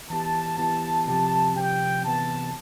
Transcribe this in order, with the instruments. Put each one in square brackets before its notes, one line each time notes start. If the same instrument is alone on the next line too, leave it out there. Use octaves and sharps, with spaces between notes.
[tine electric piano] E3 B3 E4 G4 [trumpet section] A5
[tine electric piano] E3 B3 E4 G4 [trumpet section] A5
[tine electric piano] C3 F3 C4 G4 [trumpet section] A5
[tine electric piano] C3 F3 C4 G4 [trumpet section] G5
[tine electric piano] C3 E3 B3 [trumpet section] A5